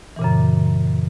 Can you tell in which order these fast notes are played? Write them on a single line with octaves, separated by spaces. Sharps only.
E3 A#2 C#3 F#2